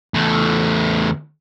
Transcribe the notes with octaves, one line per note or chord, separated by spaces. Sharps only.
E2 A3